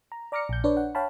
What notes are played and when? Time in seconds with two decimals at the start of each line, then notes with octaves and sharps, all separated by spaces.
0.12 A#5
0.32 D5 A#5 D6 F6 A#6 C#7
0.49 A#1 G6
0.64 D4 B4 C#5 D5
0.77 F#5
0.95 C#5 F5 G5 A5 B5